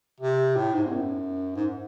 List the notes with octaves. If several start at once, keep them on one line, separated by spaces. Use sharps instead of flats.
C3
A2
G#2
E2
F#2
G#2